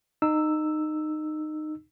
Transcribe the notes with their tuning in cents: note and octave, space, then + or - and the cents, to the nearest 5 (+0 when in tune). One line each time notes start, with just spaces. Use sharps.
D#4 -20 E6 +0